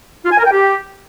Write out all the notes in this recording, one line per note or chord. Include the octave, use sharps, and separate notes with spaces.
F4
G#5
A#4
G5
G4